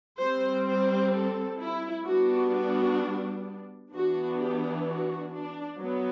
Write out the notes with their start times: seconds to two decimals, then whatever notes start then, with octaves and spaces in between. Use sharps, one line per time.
0.19 G3 C4 C5
0.65 C5
1.12 A4
1.60 E4
2.06 G3 B3 D4 F#4
2.52 F#4
3.92 E3 B3 D4 F#4
4.39 G4
4.86 F#4
5.32 D4
5.79 F#3 B3